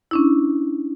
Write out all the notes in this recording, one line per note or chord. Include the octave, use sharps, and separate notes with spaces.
C#4 D4 E4